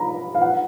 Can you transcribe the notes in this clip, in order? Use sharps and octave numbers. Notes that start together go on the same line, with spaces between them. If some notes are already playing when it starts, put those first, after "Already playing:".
Already playing: A#5 B5
F5
F#5